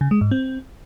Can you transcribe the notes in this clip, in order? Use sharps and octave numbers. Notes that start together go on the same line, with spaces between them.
C#3
G#3
G#2
C4